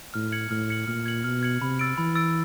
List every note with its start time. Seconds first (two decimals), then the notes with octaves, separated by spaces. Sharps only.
0.14 A2 F6
0.32 G#6 C#7 F#7
0.51 A2 F6
0.70 G#6 C#7 F#7
0.87 A#2 F6
1.06 G#6 C#7 F#7
1.24 B2 F6
1.43 G#6 C#7 F#7
1.61 C3 B5
1.79 E6 A6 D7
1.98 E3 B5
2.15 E6 A6 D7